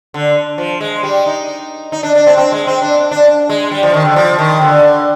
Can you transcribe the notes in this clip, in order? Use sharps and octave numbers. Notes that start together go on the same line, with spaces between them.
D3
F3
G#3
G3
D#4
D#4
D4
D4
C4
C4
G#3
C4
D4
D4
G#3
G3
F3
D#3
D3
F3
D#3
D3